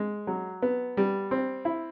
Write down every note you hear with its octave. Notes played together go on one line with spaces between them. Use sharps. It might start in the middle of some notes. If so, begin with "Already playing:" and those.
Already playing: G#3
F#3
B3
G3
C4
E4